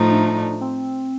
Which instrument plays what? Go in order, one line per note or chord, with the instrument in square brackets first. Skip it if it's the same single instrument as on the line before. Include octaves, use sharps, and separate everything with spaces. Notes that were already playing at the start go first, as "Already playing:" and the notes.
Already playing: [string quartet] A2 F3 A3 D#4
[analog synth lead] D4
D4
C4